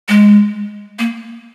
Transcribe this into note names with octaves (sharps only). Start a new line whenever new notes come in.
G#3
A#3